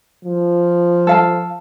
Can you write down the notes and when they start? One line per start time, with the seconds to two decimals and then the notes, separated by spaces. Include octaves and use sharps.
0.24 F3
1.07 A4 F5 A5